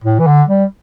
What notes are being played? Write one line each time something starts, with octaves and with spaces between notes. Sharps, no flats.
A2
E3
D3
G3